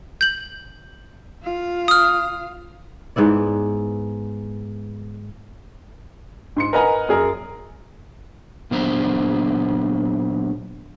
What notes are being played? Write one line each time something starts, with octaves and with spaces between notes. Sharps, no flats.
G6 F#7
F4 F5
D#6 F6
G#2 B3 E4 D5
G#2 C6 C#7
A#4 B4 D#5 F#5 G#5 A#5
F#2 G#4 A#4
A#2 F#3 B3 D4 C5 A#5